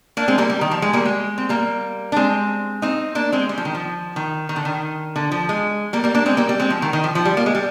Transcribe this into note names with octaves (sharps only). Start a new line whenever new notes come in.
A#3 D4
G#3 C4
G3 A#3
G3
D#3
F3
G#3
G3 A#3
G#3
C4
G3 A#3
D4
G#3 C4
C4 D#4
A#3 D4
G#3 C4
G3
F3
D#3
F3
D#3
D#3
D3
D#3
D3
F3
G#3
G3 A#3
G3 A#3
A#3 D4
G#3 C4
G3 A#3
G3
G#3 C4
F3
D#3
D#3
F3
F3
G3
A#3
G#3
G3